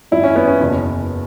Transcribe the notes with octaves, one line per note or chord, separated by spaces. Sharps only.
G#1 F#2 F#3 E4
C#4
B3
C#4
F#1 E2 B2